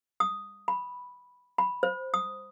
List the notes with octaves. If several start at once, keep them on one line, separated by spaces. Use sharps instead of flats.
D#6
B5
B5
C5
D#6